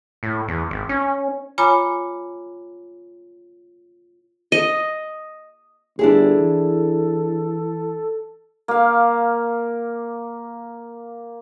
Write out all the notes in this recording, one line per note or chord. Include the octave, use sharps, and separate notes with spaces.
A2
E2
G#1
C#4
F4 C#5 G#5 A#5 B5 D6
D#5
G1 D4 E4 G#4 A4
E3
A#3 F5